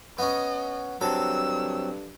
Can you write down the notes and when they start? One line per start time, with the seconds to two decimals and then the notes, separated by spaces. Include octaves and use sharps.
0.18 B3 C#4 D#5
1.01 G2 F#3 C4 A4 E6